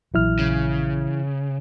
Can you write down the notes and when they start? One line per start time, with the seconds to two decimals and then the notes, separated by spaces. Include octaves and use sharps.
0.14 A#1 E3 F#3 E4 F6
0.39 C#3